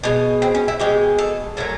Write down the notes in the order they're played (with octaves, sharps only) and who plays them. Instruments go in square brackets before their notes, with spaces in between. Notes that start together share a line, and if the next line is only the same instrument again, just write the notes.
[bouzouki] B2 G#3
C4
C#4
E4
B2 G#3 G4
A4
A#2 F#3 A3 A#4